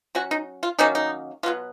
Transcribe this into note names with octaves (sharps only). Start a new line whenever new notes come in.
F#3 C#4 F#4
D#4
F4
D#3 F#3 A#3 C#4 D#4
D#4
B2 F#3 B3 F4